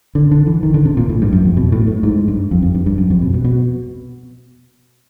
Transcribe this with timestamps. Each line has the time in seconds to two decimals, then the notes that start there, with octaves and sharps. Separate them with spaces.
0.15 D3
0.31 D3
0.47 E3
0.63 D#3
0.74 D3
0.85 C3
0.97 A#2
1.09 A2
1.22 G2
1.33 F#2
1.45 F2
1.57 B2
1.72 A2
1.87 A2
2.03 G#2
2.28 G2
2.51 F2
2.62 F2
2.75 G2
2.86 G2
2.98 F#2
3.10 F2
3.22 B2
3.34 B2
3.44 B2